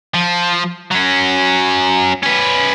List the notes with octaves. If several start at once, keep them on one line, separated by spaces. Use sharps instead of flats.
F3
F#3 C#4
C#4 B4